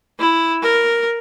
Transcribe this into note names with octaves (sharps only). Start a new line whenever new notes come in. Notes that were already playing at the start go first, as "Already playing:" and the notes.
E4
A#4